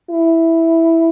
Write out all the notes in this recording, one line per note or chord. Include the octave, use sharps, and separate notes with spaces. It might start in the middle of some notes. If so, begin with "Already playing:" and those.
E4